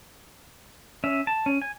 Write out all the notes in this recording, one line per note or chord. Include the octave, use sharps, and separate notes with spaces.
C#4 E5
A5
C#4
G#5